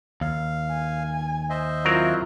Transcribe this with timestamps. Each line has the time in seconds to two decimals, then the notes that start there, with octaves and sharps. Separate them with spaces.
0.21 D#2 F5
0.71 G#5
1.50 C5 D#5 E5
1.85 F#3 C4 E4 F4 A#4